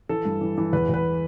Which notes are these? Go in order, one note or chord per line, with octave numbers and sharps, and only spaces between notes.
E3 A4
G2
E3
E3
E2 B4
E2 B4